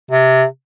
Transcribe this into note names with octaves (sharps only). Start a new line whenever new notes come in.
C3